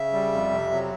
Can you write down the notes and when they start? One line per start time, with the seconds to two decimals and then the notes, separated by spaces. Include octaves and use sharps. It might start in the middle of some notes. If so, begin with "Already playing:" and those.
Already playing: C#3 E5
0.13 G3
0.32 F2
0.52 C3
0.71 F#3